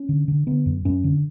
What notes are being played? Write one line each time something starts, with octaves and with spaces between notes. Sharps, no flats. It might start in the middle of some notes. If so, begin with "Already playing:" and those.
Already playing: C#4
D3
D3
D3 B3
F#2
F#2 C#4
D3